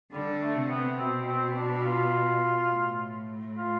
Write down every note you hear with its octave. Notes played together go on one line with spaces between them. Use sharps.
D3 G3
A3
C3
B3
B2 C4
C4
D4
F4
A2
F4